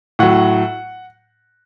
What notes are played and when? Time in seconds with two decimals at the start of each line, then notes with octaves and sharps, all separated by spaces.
0.19 A2 F#3 F#5